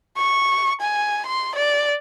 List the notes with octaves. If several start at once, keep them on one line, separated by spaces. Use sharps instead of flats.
C#6
G#5
C6
D5